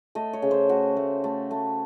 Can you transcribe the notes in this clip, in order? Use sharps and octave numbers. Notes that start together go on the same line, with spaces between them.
A3 D#5
C#5
C#3
C5
A3 F#4
A3
A3
A3